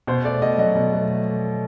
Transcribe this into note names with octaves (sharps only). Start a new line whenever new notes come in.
B2 C5
A3 D5
B2 D#5
F#3 D#5
B2
A3